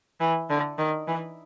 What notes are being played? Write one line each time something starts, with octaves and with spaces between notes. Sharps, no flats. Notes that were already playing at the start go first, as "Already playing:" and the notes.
E3
D3
D#3
E3